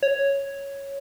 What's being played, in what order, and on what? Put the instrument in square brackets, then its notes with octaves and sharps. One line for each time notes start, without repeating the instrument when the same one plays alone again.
[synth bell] C#5